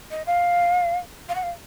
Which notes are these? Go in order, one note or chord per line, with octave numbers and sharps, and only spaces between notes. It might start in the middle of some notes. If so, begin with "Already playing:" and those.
D#5
F5
F5
F#5
F5